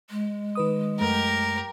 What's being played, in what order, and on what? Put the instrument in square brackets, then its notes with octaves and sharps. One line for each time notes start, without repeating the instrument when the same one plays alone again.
[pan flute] G#3
[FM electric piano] D#3 B4 D#6
[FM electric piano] F#2 A3 [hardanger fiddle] G4 A#4